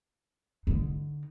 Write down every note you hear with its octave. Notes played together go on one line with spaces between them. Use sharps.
D3 D#4